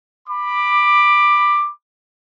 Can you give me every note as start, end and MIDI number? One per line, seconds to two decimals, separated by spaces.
0.28 1.64 83
0.28 1.64 86